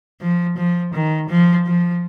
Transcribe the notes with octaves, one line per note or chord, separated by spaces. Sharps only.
F3
F3
D#3
F3
F3